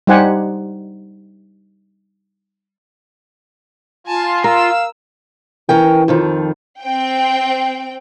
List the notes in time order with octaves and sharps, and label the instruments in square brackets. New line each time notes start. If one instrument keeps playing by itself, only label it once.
[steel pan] G3 D#4 G4 C5 F#5 G#5
[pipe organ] F4 [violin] G#5 A5
[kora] A#4 [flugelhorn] F5 [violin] E6
[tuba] E3 [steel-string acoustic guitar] C#4 A#4 G5
[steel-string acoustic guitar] F2 D#3 F3
[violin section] C4 G5